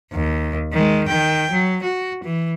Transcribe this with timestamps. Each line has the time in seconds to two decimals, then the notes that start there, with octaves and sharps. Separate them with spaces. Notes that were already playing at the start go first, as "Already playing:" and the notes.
0.13 D#2
0.73 D#3 G#3
1.08 D#3 G5
1.51 F#3
1.83 F#4
2.25 E3